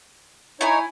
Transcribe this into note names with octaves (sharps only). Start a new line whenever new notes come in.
D#4 E4 C#5 G#5